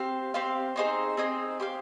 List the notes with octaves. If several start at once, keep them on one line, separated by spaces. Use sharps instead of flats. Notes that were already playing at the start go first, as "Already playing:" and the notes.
Already playing: C4 G4 C5 F5
C4 G4 C5 F5
C4 D#4 G#4 C5
C4 D#4 G#4 C5
G4 C5 F5